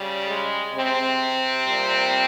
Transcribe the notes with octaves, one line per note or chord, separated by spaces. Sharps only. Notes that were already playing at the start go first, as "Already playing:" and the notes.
Already playing: C#3 G3
G#3
C3 C4
A#2 G3